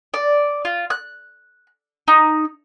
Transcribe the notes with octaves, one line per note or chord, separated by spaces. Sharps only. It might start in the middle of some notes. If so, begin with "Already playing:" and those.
D5
F4
F#6
D#4